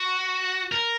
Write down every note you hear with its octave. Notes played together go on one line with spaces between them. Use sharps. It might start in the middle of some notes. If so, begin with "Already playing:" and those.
Already playing: F#4
A#4